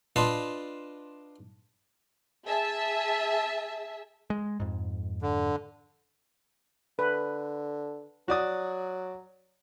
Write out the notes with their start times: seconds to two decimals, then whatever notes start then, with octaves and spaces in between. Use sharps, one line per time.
0.16 D4 F4 B4 D#5 A5 C6
2.47 G#4 E5 A5
4.30 G#3
4.60 F2 G#2
5.22 D3
6.99 D3 B4
8.28 F#3 F#4 D5 D#6